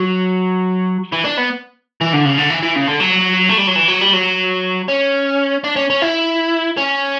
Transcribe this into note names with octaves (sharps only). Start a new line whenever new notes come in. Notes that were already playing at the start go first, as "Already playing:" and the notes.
Already playing: F#3
E3
D4
B3
E3
D3
C#3
D3
E3
E3
C#3
D3
F#3
A3
G3
F#3
E3
F#3
G3
F#3
C#4
D4
C#4
C#4
E4
C#4